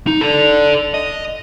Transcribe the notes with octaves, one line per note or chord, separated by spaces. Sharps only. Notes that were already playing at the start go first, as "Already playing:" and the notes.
D#4
A4 D5
D#5